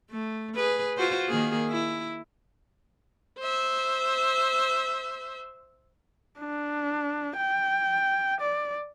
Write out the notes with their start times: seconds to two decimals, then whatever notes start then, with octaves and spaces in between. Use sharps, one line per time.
0.10 A3
0.55 G#4 B4
0.97 F4 F#4 C5
1.28 D#3 A#3 G#4
1.69 E4
3.39 C5 E5
6.39 D4
7.37 G5
8.41 D5